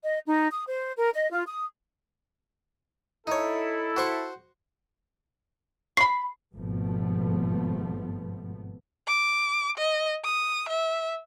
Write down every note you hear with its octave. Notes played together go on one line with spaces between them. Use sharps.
D#5
D#4
D#6
C5
A#4
D#5
F4
D#6
D#4 E4 A4 C#5
F#4 C5 C#6
B5 C#6 C7
G#1 G2 B2 F3 A3 B3
D6
D#5
D#6
E5